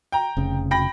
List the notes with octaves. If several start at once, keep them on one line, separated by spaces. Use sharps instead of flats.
G5 A#5
F1 C#3
G5 B5 A#6